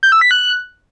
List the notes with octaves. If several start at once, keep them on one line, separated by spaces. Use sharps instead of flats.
G6
E6
B6
F#6